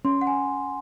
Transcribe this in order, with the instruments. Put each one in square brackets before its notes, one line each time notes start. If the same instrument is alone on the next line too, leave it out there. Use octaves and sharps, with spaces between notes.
[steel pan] C#4 [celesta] C6
[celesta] F#5
G#5